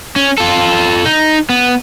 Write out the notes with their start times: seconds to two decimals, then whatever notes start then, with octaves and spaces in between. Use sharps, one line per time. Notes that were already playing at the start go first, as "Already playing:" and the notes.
0.16 C#4
0.38 F4 A4
1.06 D#4
1.49 B3